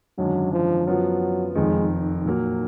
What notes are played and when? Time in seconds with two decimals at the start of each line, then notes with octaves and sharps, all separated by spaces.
0.18 G#1 F#2 D3 F#3 G#3 D4
0.53 F3
0.87 F#2 F3 F#3 B3 F4
1.55 F1 F2 D#3 G#3
2.25 A#2 F#3 A#3